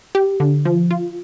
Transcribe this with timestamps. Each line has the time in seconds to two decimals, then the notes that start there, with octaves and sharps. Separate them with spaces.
0.15 G4
0.40 D3
0.65 F3
0.91 F4